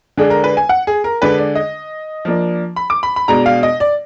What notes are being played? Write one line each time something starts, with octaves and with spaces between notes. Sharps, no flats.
D3 G#3 D4 G#4
A#4
B4
G#5
F#5
G#4
A#4
D3 G#3 D4 B4
D5
D#5
F3 A#3 D4
B5
D6
B5
B5
B2 G#3 D4 A#5
F5
D#5
D5